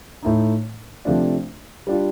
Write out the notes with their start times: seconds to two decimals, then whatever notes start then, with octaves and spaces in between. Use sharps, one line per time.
0.23 A2 A3 D#4
1.05 C3 F3 A3 D4
1.87 G3 D4 F4